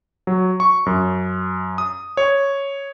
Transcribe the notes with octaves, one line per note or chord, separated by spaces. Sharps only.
F#3
C#6
F#2
D#6
C#5